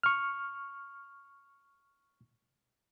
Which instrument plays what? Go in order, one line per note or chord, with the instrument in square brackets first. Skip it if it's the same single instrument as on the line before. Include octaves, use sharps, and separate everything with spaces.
[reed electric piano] C#6 F6